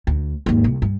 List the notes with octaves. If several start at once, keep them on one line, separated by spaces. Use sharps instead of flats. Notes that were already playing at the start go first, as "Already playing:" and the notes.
D2
D#2 G#2
C2
G2